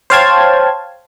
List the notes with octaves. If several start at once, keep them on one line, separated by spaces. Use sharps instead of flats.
C5 C#5 F5 G5 A5 G#6